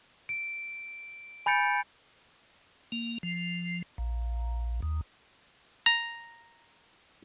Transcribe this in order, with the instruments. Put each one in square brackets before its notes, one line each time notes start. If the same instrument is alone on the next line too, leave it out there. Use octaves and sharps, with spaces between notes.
[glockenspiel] D7
G#5 B5 G6 A6 C#7 D7
[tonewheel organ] A#3
F3
A#1
D#2
[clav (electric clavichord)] A#5